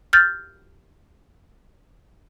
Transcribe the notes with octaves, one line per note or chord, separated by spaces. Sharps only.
F6 G6 A6